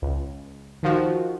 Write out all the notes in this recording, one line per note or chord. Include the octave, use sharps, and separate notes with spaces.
C#2
D#3 F3 F#4